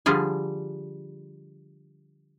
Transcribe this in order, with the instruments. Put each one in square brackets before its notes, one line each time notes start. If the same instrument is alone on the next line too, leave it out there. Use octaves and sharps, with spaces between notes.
[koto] D3 F3 G3 G#4